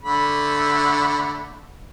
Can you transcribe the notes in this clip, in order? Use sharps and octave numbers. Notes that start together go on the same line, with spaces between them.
D3 A3 B5